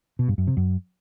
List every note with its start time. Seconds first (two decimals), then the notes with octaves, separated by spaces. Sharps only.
0.19 B2
0.28 G2
0.38 F#2
0.47 C3
0.57 F#2